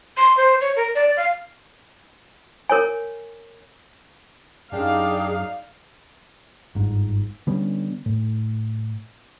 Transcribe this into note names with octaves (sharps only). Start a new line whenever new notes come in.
C6
C5
C#5
A#4
D5
F5
A#4 C#5 G#5
F#2 D4 D#4 G4 G#4 D5 F5
G1 G#2
D3 G3 B3 C#4
A2